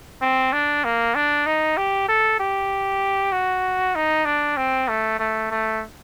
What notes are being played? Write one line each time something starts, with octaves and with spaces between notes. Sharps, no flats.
C4
D4
A#3
D4
D#4
G4
A4
G4
F#4
D#4
D4
C4
A3
A3
A3